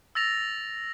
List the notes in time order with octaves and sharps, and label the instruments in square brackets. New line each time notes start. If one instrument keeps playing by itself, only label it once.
[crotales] E6 A6 A#6 F7